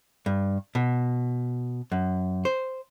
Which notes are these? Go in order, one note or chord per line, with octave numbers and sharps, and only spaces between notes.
G2
B2
F#2
C5